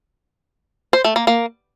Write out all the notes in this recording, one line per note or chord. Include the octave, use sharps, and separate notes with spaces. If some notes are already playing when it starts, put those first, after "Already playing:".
C5
A3
A#3
A#3